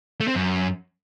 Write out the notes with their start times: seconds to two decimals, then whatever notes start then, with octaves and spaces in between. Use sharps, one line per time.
0.21 A3
0.28 C4
0.35 F#2